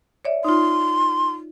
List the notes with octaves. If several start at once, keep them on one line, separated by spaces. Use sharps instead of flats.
C#5 D5 E5
D#4 F4 C6